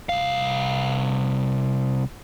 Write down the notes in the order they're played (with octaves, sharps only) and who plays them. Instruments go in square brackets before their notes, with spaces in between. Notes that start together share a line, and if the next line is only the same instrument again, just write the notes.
[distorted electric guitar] C2 F5